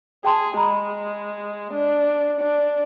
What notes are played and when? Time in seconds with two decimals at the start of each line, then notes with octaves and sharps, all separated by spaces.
0.25 G#4 G5 A5 C6
0.57 G#3 A#5 B5
1.73 D4
2.40 D4